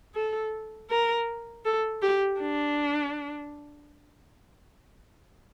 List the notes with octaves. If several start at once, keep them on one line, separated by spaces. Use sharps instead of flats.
A4
A#4
A4
G4
D4